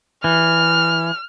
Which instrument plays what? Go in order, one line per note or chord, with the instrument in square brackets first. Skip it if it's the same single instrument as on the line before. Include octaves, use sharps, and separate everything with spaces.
[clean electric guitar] E3 [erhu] F6